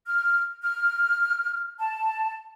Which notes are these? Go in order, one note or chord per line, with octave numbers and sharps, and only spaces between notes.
F6
F6
A5